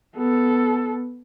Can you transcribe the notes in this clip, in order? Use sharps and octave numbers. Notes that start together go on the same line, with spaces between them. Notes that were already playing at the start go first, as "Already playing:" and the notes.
B3 A4